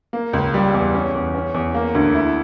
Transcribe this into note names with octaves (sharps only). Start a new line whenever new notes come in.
A#3
C#2
G3
E2
C#4
E2
C#4
E2
A#3
D2
E4